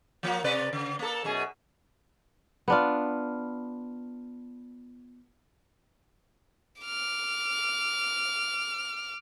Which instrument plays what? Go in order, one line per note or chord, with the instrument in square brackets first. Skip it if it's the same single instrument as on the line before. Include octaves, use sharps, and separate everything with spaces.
[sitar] F3 A#3
C3 B4 D5
C#3
A#3 A4
F#2 B2 G#4
[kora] B3 D4 F4
[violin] D6 F6